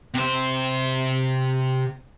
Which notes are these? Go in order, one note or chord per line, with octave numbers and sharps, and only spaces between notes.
C3 C5